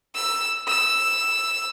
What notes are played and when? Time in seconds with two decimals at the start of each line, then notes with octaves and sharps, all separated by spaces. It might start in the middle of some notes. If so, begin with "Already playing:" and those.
0.15 E6
0.67 E6